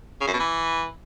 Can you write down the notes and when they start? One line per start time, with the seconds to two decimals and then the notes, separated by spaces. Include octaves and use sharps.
0.21 C#3
0.27 F#2
0.33 B2
0.39 E3